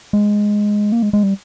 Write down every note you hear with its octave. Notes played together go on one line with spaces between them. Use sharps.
G#3
A#3
G#3
G#3
G3